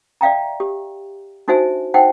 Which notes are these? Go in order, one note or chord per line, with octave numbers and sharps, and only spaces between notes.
D5 E5 F5 G5 A#5
G4
D4 D#4 F#4 C5 E5 G#5
D#4 C5 F#5 G5